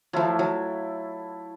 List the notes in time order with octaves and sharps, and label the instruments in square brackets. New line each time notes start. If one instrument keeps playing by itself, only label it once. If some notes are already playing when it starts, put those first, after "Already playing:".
[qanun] F3 F#3 [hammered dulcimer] A3 E4 F4
[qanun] F#3